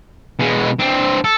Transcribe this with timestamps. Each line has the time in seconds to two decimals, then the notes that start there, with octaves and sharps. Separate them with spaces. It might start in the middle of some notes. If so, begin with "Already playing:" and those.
0.39 B2 G#3
0.79 C4 D4
1.24 A4